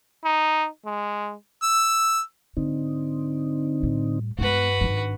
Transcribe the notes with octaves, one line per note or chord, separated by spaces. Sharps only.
D#4
G#3
E6
G#2 D3 C4 D#4
A2 G3
G2 G#3 B3 F#4 B4
G#1 D4